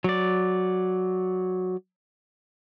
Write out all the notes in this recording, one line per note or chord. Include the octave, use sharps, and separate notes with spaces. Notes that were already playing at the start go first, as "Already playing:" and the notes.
F#3 D5